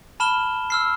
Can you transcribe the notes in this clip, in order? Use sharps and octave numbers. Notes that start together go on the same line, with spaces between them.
A5 B5 F6 E7 G7
E6 F6 C7